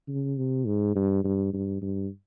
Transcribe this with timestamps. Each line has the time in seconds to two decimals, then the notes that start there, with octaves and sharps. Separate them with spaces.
0.08 C#3
0.37 C3
0.66 G#2
0.96 G2
1.24 G2
1.53 G2
1.82 G2